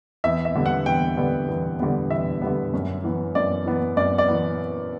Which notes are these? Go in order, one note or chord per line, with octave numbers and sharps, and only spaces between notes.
E2 E5
E5
D3 G3 B3
F#5
E2 G5
D3 G3 B3
E2
D3 G3 B3
E2 E5
D3 G3 B3
F#2
E3 B3
F#2 D5
E3 B3
F#2 D5
D5
E3 B3